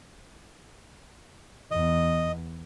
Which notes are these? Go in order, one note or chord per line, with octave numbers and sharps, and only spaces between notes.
E2 D#5